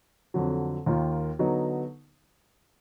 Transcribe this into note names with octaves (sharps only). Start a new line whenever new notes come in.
F2 D3 F#3
D#2 D#3 A#3 F4
D3 F#3 B3 D#4